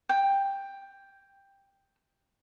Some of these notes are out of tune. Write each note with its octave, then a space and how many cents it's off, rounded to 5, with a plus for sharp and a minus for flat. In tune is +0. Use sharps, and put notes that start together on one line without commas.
G5 +10